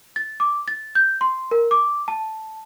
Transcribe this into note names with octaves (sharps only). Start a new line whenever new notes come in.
A6
D6
A6
G6
C6
A#4
D6
A5